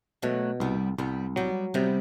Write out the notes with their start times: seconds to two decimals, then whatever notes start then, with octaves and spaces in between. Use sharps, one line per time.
0.22 B2 F#3 A3
0.60 C2 G3 B3
0.98 C2 G3 B3
1.36 F#3 G3 B3
1.74 C3 G3 B3